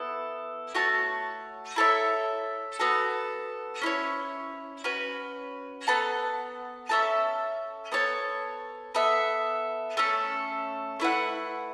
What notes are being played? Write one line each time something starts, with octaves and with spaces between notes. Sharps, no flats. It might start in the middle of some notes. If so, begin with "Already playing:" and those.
Already playing: B3 E4 A4
A3 F#4 C#5 A5
E4 A4 C#5 E5
B3 F#4 A4
C#4 E4 C#5
C#4 F#4 B4
B3 A4 F#5 A5
C#4 A4 E5 A5
B3 A4 C#5 A5
B3 A4 E5
A3 C#4 A4
A3 E4 B4 F#5